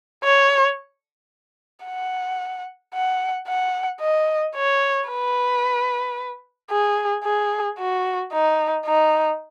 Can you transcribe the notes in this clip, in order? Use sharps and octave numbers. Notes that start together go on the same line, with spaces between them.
C#5
F#5
F#5
F#5
D#5
C#5
B4
G#4
G#4
F#4
D#4
D#4